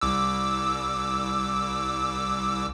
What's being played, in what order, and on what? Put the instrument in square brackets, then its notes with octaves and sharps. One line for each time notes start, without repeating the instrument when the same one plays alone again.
[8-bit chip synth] C2 D6 E6